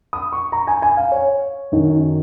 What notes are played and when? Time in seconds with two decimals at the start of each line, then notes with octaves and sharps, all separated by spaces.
0.13 D#6
0.32 C#6
0.52 A#5
0.67 G#5
0.82 G#5
0.97 F5
1.12 C#5
1.72 F#2 D#3 F#3